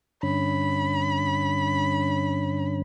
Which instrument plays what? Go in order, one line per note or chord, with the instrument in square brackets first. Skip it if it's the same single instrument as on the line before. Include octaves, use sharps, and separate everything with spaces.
[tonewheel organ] G2 D3 C#4 [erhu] B5